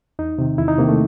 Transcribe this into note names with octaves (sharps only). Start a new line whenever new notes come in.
E2 D#4
C3 D#3
E2 E4
D#4
C3 A#3
D#3
A3